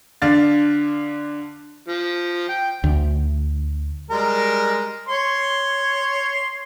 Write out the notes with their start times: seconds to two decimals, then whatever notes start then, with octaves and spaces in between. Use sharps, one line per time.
0.22 D3 D4 F5 A6
1.88 F3
2.49 G5
2.84 D2
4.10 G3 G#3 A#4
5.08 C#5 C6